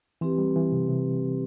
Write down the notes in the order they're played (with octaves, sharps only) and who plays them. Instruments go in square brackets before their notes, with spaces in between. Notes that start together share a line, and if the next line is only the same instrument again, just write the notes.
[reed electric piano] E3 [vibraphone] C4 G4 B4
[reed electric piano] G3
E3
C3
C3